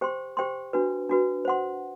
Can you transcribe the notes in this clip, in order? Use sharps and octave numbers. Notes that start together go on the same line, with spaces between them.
G4 C5 G5 C6
G4 C5 G5 C6
D4 F#4 B4
D4 F#4 B4
C5 F#5 C6